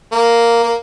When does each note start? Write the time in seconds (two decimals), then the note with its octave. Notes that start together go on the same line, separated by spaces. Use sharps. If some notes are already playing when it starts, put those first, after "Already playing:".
0.12 A#3
0.63 A#3